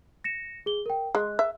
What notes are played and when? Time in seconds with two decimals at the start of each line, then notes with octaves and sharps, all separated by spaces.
0.24 A#6 C#7 E7
0.66 G#4 G7
0.86 A#4 G5
1.15 G#3 G#4 F#6
1.39 E5